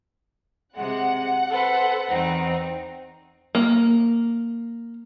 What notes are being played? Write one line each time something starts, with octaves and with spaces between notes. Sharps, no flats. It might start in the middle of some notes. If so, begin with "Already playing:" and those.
C3 G#3 F#5
A4 B4 C5
E2 C4 D#4
A#3